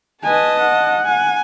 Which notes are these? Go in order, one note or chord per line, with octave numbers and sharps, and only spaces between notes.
B4 D#5 G#5 A5
F#5
G#5